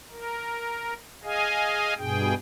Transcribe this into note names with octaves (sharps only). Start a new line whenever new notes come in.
A#4
G#4 D#5 F5 G#5
G2 B2 G#4 G5